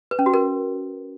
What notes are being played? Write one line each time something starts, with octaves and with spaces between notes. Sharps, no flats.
B4
C#4
F#4
A#4